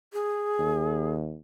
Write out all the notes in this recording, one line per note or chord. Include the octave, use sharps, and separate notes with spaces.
G#4
D#2